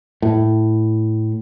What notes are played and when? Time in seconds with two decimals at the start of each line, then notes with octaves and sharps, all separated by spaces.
0.22 A2